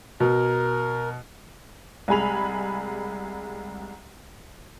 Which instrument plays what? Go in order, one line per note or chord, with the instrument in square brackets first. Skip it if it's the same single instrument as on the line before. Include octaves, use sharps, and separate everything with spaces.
[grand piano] B2 [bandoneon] A#4
[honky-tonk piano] C2 G#3 G#5 B5 F7